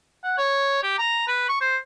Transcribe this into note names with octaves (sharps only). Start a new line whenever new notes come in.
F#5
C#5
G4
A#5
B4
C#6
C5